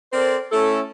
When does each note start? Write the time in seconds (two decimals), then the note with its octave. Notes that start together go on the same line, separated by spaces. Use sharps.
0.13 C4 A4 A#4 C5 D5
0.52 A3 C#4 E4 A4